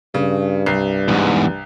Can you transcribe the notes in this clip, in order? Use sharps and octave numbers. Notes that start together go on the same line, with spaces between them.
G2 C#3
C2 C7
E2 G#2